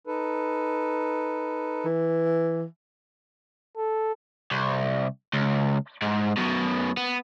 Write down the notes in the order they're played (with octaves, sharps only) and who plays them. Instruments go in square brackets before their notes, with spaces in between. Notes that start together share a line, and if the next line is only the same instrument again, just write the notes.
[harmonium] D#4 A4 B4
[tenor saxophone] E3
[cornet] A4
[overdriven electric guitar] C2
C#2
G#2
F#2 B2
B3